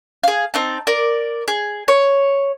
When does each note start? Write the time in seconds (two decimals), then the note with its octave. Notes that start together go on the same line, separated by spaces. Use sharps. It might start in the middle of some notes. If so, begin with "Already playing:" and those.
0.23 G#4 F5
0.54 C4 D#4 A5
0.87 A#4 D5
1.48 G#4
1.88 C#5